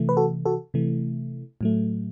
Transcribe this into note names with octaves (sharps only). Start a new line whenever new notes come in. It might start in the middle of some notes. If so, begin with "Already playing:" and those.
Already playing: C3 E3 A3
B4
F#4 A4
F#4 A4
C3 E3 A3
A2 F#3 A3